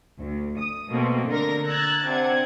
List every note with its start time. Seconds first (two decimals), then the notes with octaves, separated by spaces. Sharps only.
0.19 D2
0.58 D#6
0.90 B2 A3 A#3 C4
1.29 D3 A#4 A#6
1.67 A#5 E6 F#6 G#6 A6
2.08 C3 D4 F#5 G#6